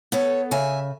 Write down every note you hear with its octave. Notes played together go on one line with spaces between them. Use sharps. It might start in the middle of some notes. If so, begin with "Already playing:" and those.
B3 A4 C#5
C#3 E5 G#5